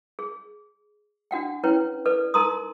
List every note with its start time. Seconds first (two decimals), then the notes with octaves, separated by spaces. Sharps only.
0.19 G#4
1.31 D4 F#4 F#5 G5
1.64 C#4 E4 B4 C#5 G5
2.06 A4 B4 D5
2.34 D#4 A4 A#4 A#5 C6 D#6